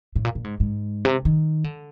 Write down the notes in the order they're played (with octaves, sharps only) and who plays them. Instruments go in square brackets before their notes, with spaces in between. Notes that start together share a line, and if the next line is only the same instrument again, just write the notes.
[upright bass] A2
A#2
A#2
G#2
G#2
C3
D#3
D3